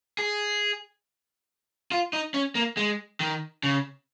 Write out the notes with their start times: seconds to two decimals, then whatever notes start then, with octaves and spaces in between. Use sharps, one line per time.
0.19 G#4
1.92 F4
2.13 D#4
2.34 C#4
2.55 A#3
2.77 G#3
3.20 D#3
3.63 C#3